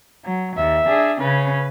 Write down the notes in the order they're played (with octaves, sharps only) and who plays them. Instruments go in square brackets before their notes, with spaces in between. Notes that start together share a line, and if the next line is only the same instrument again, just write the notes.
[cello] F#3
[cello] D#2 [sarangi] E5
[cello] D4 G#4
[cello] C#3 C#4 [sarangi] B4